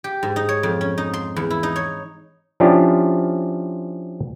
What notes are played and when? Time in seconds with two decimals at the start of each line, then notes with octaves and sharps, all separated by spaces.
0.04 G4
0.23 G#2
0.36 D#4
0.49 C#5
0.63 F2
0.81 C#4
0.98 D#4
1.14 C6
1.36 E2
1.50 E4
1.63 D#4
1.76 C#5
2.60 F3 C#4 D4 E4 F4 G4